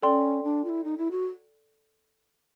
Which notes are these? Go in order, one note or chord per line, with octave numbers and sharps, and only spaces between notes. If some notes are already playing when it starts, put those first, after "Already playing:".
C#4 A4 D5 G5 C6
D4
F4
E4
D#4
E4
F#4